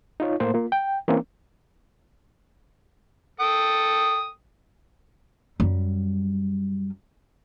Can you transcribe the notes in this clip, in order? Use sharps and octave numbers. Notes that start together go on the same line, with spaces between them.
D#4 F4 C#5
A2 A#3 C5
A#3 F4
G5
E3 A#3 C4 C#4
A4 G5 D#6
F#2 G3